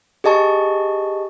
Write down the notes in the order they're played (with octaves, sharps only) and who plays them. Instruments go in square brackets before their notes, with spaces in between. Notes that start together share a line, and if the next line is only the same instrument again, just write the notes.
[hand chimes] G4 G#4 D#5 A5 C#6